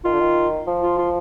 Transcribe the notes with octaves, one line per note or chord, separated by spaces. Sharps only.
D#3 F4
D3
D#3
F3
F4
F4